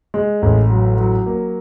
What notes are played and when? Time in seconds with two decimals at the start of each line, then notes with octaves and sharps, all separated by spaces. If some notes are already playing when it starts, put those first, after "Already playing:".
0.14 G#3
0.42 A1
0.70 F#3
0.97 F#3
1.26 A#3